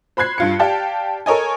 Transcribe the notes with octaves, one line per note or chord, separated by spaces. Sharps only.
C5 B5 F#6 G#6 C7
G2 F4 C#7
G4 D5 F5 G5 A5
A4 A#4 C#5 D#5 G#5